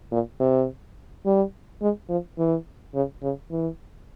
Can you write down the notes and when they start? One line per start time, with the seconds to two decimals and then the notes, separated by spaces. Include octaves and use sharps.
0.12 A#2
0.40 C3
1.25 G3
1.82 G#3
2.09 F3
2.38 E3
2.95 C#3
3.23 C#3
3.51 E3